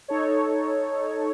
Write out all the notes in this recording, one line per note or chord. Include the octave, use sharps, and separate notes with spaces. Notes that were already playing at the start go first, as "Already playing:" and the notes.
D#4 A4 C#5